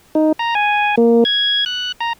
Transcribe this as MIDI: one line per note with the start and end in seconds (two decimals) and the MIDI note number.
0.15 0.32 63
0.39 0.54 82
0.55 0.95 80
0.97 1.24 58
1.25 1.65 92
1.66 1.92 90
2.00 2.13 82